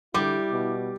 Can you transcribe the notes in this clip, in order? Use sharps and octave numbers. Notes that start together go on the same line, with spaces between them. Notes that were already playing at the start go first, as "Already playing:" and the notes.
D3 G3 E4 D6
B2